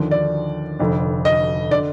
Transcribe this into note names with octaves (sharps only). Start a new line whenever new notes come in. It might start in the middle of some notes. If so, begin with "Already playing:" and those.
Already playing: D#2 D3 F3
D5
F1 F2 D3
D#5
D3 D5